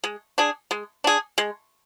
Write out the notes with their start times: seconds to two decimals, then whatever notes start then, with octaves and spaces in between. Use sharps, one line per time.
0.04 G#3
0.38 D4 G#4
0.71 G#3
1.04 D4 G#4
1.38 G#3